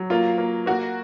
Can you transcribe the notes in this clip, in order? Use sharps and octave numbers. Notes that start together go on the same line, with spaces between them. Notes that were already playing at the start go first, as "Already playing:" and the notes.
Already playing: F#3
A#3 F4
A#3
A#3 F#4